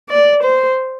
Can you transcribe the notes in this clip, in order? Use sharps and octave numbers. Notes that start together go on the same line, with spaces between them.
D5
C5